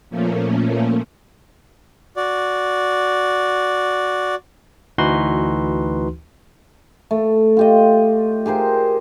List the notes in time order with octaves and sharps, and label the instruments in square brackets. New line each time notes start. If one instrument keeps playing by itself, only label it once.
[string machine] A#2 F3 A3 A#3 C#4
[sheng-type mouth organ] F#4 D5
[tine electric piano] D2 E3 D#4 F#4 B4 C6
[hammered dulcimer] A3
F4 G4 D#5
G4 G#4 A#4 C5